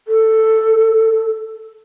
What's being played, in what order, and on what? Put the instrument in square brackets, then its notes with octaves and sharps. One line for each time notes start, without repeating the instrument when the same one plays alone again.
[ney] A4